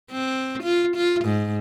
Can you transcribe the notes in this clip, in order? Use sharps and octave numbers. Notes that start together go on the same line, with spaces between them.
C4
F4
F4
G#2